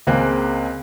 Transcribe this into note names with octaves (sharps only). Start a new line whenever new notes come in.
C#2 A#3 C4 G#4 F#6